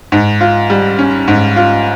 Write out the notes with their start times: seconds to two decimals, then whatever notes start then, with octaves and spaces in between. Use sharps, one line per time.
0.12 G#2
0.41 F4
0.70 G3
0.98 C#4
1.28 G#2
1.56 F4